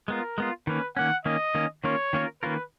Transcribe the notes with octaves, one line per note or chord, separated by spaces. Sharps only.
G#3 B3 F4 A#4
G#3 B3 F4
D#3 A#3 C#4 B4
D#3 A#3 C#4 F#5
D#3 A#3 C#4 D#5
D#3 A#3 C#4
D#3 A#3 C#4 F4 A#4 C#5
D#3 A#3 C#4 F4 A#4
D#3 A#3 C#4 F4 A#4 B4